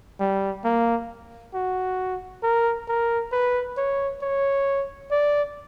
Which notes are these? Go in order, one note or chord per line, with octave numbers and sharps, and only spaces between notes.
G3
A#3
F#4
A#4
A#4
B4
C#5
C#5
D5